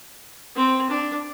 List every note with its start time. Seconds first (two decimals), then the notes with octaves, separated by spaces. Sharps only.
0.56 C4
0.89 D4